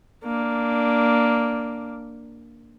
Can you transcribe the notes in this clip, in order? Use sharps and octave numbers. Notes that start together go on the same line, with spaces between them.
A#3 D4